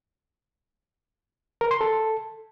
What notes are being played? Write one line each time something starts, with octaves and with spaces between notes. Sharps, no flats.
A#4
C6
A4